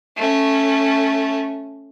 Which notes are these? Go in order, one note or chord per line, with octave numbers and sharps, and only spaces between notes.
A3 C#4